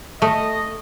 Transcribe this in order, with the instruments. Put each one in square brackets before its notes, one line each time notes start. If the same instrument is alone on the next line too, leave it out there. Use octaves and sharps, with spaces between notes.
[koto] A3 [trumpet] D#5